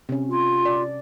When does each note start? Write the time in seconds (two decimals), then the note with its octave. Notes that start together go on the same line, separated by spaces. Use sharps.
0.09 C3 C#4
0.29 F4
0.65 D5